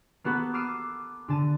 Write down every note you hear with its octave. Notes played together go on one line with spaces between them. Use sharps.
A#3 B3 F#4 A4 B4
D6 E6 F6 C7 D7 D#7
D3 A5 D#7